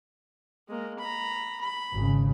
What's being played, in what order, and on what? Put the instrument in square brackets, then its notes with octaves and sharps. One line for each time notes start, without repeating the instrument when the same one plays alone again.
[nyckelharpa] G#3 A#3
A#5 B5
B5
[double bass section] G#1 C#3